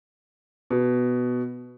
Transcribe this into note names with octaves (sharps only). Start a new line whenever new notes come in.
B2